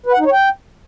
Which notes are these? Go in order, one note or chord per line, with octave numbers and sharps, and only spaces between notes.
B4
F#5
D#4
C#5
G5